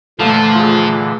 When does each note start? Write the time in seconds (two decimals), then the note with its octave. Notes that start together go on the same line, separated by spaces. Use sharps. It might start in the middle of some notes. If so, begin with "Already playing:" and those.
0.19 A#2 D3 E3 F3 A3 A4 F5 A5
0.55 F4 G#4